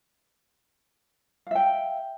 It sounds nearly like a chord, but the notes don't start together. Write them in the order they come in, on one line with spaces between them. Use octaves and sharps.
F5 E5 G5